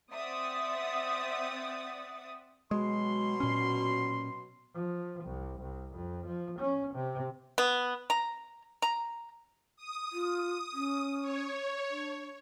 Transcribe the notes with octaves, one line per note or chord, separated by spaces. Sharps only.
C4 D5 E5 F#5 D#6 A6
B2 F#3 G#3 C6
A#2 C#4
F3
C2
C2
F2
F3
C#4
C3
B3
A#5
A#5
D#6
F4
C#4
C#5
D4